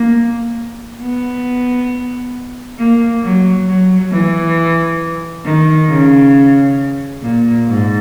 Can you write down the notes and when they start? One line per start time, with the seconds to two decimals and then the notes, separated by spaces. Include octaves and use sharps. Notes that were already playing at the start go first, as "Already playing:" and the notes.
Already playing: A#3
1.01 B3
2.78 A#3
3.22 F#3
3.67 F#3
4.12 E3
5.45 D#3
5.89 C#3
7.22 A#2
7.67 G#2